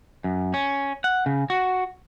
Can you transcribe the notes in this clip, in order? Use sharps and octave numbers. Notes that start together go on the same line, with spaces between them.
F#2
C#4
F#5
C#3
F#4